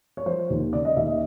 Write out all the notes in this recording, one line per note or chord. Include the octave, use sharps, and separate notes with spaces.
C#5
F3 C5
D#2
C#3 D5
D#5
D#2 E5
D#5